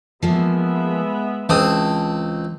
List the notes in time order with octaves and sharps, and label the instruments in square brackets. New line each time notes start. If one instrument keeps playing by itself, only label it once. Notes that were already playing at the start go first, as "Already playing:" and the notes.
[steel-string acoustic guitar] F3 A#3 [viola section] G#3 B3 E5
[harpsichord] C#2 C4 D#6 [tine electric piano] E3 [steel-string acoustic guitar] A5